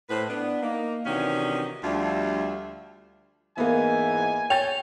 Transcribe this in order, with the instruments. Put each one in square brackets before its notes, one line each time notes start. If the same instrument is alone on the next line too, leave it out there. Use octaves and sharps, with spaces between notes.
[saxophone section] A2 B4 C5
B3 D4
A#3 D#4
C3 D#3 E3 C#4 D4 F#4
D2 F3 G3 F4 E5
[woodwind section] G#2 E3 [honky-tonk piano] A#3 B3 [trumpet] G#5
[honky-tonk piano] C#5 G6 A6 [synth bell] G5 F7